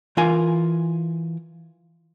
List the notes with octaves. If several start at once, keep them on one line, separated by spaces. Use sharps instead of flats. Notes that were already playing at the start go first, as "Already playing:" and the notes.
E3 F4 A#4 G#5